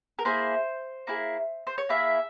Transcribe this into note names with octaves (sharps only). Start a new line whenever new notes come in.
A#4
A#3 E4 G#4 C5
A#3 E4 G#4
C5
C#5
A#3 E4 G#4 E5